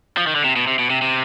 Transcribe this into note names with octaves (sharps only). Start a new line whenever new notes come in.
F3
D#3
D3
C3
B2
C3
B2
C3
C3